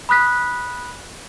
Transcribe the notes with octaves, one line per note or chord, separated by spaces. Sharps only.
B5 D#6 F#6 B6